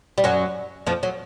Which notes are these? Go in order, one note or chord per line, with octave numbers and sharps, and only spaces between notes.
G3
F#2 F#3
F2 F3
F#3